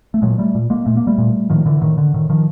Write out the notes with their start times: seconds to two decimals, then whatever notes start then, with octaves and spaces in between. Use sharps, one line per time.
0.14 A3
0.22 A#2 F#3 G#3
0.38 G3 A3
0.55 A#2
0.70 G#3 A#3
0.86 A#2 A3
0.97 A#3
1.07 G3 A3
1.18 A#2
1.50 A2 D#3 F3
1.66 D3 E3
1.82 A2 D#3
1.98 D3
2.14 A2 D#3
2.30 D#3 F3